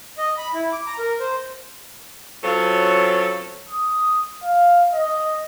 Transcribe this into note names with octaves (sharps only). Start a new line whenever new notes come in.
D#5
B5
E4
D6
A#5
A#4
C5
F#3 C4 C#4 F4 A4
D#6
F5
D#5